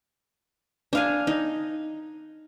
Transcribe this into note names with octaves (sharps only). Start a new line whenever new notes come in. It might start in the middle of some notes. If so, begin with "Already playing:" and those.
D4 F5 G#5
D#4